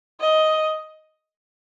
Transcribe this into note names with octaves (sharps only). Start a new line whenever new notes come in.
D#5